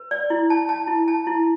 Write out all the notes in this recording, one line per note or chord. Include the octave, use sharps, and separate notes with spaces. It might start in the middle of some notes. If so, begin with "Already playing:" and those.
Already playing: B4
D5
E4
A5
A5
E4
A5
E4